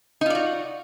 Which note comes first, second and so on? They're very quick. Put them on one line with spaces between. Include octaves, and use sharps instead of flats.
D#4 F4 D5 F#4